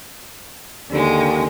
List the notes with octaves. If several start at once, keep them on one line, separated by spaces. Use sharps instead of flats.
D#2 D3 G#3